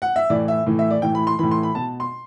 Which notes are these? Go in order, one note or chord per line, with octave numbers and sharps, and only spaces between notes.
F#5
E5
A2 E3 D5
E5
A2 E3
E5
D5
A2 E3 G5
B5
C6
A2 E3 B5
C6
B5
B2 A5
C6